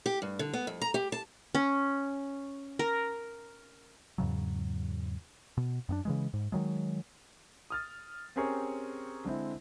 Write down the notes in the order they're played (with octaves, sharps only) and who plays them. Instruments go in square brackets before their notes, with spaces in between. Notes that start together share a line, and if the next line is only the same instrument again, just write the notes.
[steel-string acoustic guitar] G4
G2
D3
B3
F2
A#5
G4
A5
[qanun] C#4
A#4
[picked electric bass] E2 G#2 C#3 F#3
B2
F#2 B3 D4
C#3 E3 G#3
G#2
D#3 F#3 G#3
[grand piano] D#6 F6 A6
C4 C#4 G4 G#4 A#4 C#5
D3 G#3 C4 E4